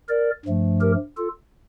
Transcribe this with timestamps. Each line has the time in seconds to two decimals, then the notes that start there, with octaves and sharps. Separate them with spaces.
0.08 A#4 D5
0.45 G2 F3 A3
0.81 G4 A#4
1.17 F4 A4